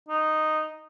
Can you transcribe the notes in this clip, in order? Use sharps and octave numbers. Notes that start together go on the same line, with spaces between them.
D#4